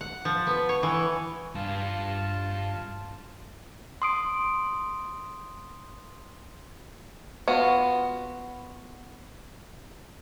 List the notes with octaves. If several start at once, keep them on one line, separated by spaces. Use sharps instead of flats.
F#5
F3
B3
C#5
E3
G2 F4 A5
C6 D#6 D7
B3 F4 F#4